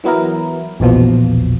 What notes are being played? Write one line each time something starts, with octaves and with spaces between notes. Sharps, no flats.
E3 F#3 B3 E4 A#4
A#1 E2 B2 F3